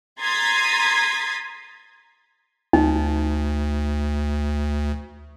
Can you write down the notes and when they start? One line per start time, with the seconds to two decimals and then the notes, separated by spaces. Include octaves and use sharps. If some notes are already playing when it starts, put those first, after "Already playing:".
0.20 A#5 C6 D#6 G#6 A6 B6
2.73 D2 D#4